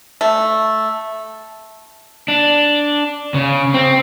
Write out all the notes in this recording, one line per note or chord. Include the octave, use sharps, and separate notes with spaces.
A3
D4
C#3
C4